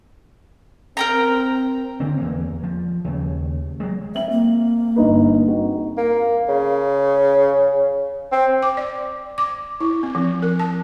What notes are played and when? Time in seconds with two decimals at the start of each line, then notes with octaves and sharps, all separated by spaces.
0.97 C4 A#4 G5 A#5
2.00 D3 C4
2.17 E2 E3 A#3
2.64 F3
3.04 D#2 C#3
3.80 F#3 G#3
4.15 C4 E5 F#7
4.30 A#3
4.96 G1 D#4 B4
5.48 C4 D#4 F#4
5.98 A#3
6.48 C#3
8.32 C4
8.63 D6
8.77 D5
9.38 D6
9.80 E4
10.03 C4
10.15 F3
10.42 A#4
10.59 A5